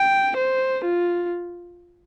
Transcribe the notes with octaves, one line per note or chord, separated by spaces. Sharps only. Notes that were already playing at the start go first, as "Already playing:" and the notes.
Already playing: G5
C5
F4